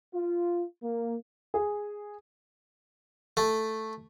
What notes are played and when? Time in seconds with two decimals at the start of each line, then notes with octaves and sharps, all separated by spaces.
0.14 F4
0.83 A#3
1.54 G#4
3.37 A3